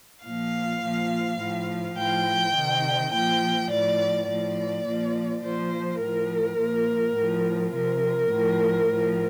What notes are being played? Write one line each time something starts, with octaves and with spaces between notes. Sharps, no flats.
A#2 F3 F5
A#2 F3
A2 F3
A2 F3 G5
C3 D#3
A#2 F3 G5
A2 F3 D5
A2 F3 D5
A#2 F3
A#2 F3 C5
A2 F3 A#4
A#2 F3
A2 F3
C3 F3 A#4
A2 F3
A2 F3